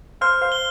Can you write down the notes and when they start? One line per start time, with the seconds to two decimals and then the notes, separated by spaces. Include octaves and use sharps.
0.21 C5 F5 F6
0.41 C5 F5
0.52 G7